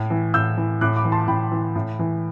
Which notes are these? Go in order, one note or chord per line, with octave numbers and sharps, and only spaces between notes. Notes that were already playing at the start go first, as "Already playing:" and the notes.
Already playing: A2
E3
A2 E6 G6
E3
A2 D6 F#6
B5 D6
E3
A5 C6
A2 G5 B5
E3
A2
E3